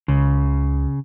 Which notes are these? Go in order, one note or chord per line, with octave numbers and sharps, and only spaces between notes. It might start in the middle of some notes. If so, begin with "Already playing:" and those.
C#2 C#3